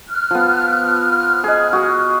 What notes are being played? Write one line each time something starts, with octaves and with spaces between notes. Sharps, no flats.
F6 F#6
F3 B3
G#4 D#5
F#4 G#4